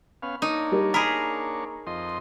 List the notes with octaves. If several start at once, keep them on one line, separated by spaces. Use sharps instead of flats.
B3 C#4 F5
A#3 D4 D#4 C#5
G3 G4 A#4
G#4 A#4 A#5 B5 B6
F2 D#5 C6